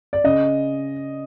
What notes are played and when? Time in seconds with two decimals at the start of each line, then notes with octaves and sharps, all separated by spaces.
0.13 D5
0.24 C#3 D#5